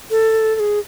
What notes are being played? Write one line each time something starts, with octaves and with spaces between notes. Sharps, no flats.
A4
A4
G#4